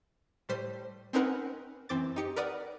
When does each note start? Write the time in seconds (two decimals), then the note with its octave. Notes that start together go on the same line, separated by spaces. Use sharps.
0.49 A2 G3 C5 B6 C7
1.13 C4 C#4 D#4 A#4 B4 F#5
1.89 F#2 E3 C4 D6 A6
2.16 D#4 G4 C#7
2.36 A#4 B4 D5 F#5 D#6